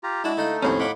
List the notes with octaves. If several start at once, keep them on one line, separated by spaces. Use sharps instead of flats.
F4 G4 A#5
G#3 D4 E4 F#4 F#5 A5
D3 A3 D#4 A4 D#5 F5
D#2 A2 C3 F3 C4 C#4
D#4 F4 F#5 B5 D6